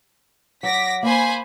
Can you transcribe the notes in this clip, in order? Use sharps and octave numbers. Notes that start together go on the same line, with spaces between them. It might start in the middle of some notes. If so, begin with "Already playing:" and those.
F#3 F#5 D6 A#6 B6
A#3 C5 G#5 B5